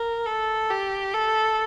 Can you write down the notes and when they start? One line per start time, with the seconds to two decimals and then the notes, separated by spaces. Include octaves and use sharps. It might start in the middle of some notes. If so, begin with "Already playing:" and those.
Already playing: A#4
0.26 A4
0.70 G4
1.14 A4